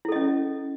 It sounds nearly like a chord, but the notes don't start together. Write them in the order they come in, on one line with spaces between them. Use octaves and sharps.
E4 A4 D#5 C#4